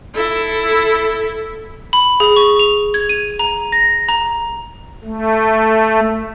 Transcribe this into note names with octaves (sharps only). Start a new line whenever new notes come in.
E4 A4
B5
G#4
C#6
F7
G#6
D#7
A#5
A#6
A#5
A3